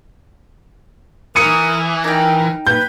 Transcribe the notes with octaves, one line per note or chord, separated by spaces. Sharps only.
E3 A#4 D#6 C#7 D#7
D#4 A#4 G5
B4 G6